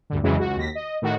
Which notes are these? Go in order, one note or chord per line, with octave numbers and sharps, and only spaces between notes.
D2 G2 D3
F2 C#3 E3 F#3 G#3 E4
C#2 F#4
D#2 A#6 B6
D#5
A2 D#3 F#4